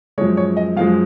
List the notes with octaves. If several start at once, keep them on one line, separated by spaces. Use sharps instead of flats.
F#2 F3 G#3 C#5
C#5
D#5
F#2 F3 G#3 F5